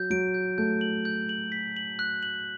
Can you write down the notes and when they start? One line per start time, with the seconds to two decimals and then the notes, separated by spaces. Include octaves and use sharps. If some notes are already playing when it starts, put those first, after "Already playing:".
Already playing: F#3 G6
0.10 F#3 D7
0.34 G6
0.58 A3 G6
0.81 F#7
1.05 G6
1.29 F#7
1.52 B6
1.77 F#7
1.99 F#6
2.23 F#7